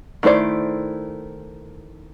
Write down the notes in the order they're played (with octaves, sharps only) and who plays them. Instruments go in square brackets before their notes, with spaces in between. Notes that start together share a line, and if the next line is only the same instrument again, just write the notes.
[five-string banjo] D#3 A3 E4 C5 D5